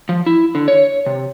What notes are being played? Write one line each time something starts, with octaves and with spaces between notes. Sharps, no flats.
F3
E4
D3
C#5
C3